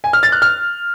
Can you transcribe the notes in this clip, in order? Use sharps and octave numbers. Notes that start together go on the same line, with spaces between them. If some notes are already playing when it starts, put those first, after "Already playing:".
G#5
F6
A6
F#6
F6